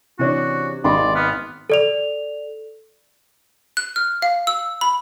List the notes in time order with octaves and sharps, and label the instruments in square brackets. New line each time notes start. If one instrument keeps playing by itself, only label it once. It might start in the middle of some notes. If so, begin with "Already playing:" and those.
[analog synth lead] C3 [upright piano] E3 C#4 D4 [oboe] F#4
[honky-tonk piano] G#1 C6 [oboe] D5 [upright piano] D#5 B5
[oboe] B3 [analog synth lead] F6
[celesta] A4 D5 F7
[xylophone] F#6
F6
F5
E6
B5